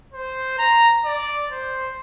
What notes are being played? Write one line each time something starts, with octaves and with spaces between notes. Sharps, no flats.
C5
A#5
D5
C5